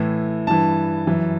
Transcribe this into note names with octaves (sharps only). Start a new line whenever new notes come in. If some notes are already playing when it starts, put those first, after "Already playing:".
Already playing: A2 E3
G2 E3 A5
F#2 E3